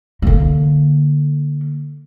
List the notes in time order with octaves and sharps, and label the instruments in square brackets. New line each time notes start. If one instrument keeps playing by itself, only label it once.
[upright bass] D3 A#3